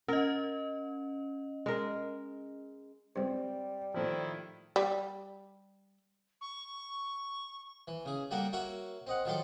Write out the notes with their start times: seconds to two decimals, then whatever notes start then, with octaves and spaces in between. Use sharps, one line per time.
0.08 C#4 A#4 D#5
1.66 G#3 A#4
3.16 C#2 G2 G3 C4
3.94 A2 D#3 F3 E4
4.76 G3
6.41 C#6
7.87 E3
8.05 C#3 G#4
8.31 G3 A#3 F#4 A4 A#4
8.53 A#3 F#4 C#5 E5
9.07 C4 D#5 F#5
9.25 D#3 F3 F#3 A4 C6 D6